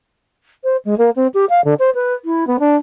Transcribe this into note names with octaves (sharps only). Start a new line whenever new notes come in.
C5
G#3
A#3
C4
G4
F5
D3
C5
B4
E4
B3
D4